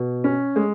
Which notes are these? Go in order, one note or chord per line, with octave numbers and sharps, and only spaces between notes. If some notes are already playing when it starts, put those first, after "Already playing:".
Already playing: B2
C#4
G#3